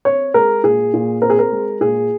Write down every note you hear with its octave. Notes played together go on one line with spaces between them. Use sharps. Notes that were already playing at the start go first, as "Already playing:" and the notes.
C4 C#5
G#3 A#4
A#2 G#4
A#2
C4 A#4
G#4
A#4
G#3
A#2 G#4